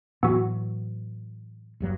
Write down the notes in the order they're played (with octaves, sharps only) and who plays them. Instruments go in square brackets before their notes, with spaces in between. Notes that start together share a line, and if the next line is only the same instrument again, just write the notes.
[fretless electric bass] A2 E3 F#3 [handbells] B3 F#4
[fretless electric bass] F#1 G2 F#3